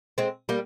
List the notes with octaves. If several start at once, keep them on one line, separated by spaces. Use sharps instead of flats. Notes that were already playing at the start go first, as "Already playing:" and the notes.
G#3 C4
G3 A#3